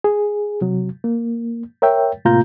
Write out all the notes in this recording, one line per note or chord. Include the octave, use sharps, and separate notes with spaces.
G#4
C3 F#3
A#3
A#4 C#5 E5 G5
A2 C3 A#3 F4 A#5 G6